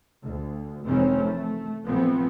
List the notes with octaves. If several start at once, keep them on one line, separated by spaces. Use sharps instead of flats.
D2
F1 D#3 E3 G#3 C4 C#4
A3
A#1 E3 F3 A3 B3 C4